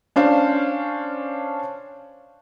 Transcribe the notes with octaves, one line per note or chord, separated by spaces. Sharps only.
C#4 D4 C5 F5